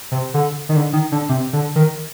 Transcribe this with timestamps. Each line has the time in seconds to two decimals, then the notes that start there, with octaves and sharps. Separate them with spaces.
0.11 C3
0.34 D3
0.69 D#3
0.76 D3
0.93 D#3
1.12 D3
1.29 C3
1.53 D3
1.75 D#3